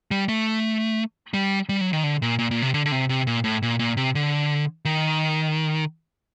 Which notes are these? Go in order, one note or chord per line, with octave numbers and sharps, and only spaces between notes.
G3
A3
G3
G3
F#3
D#3
D3
A#2
A#2
A#2
C3
D3
D3
C3
C3
A#2
A2
A#2
A#2
C3
D3
D#3